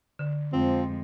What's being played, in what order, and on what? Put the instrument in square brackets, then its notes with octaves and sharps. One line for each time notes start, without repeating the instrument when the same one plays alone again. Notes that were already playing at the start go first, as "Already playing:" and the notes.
[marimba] D3
[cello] F2 G#3 [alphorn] F3 [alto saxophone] C4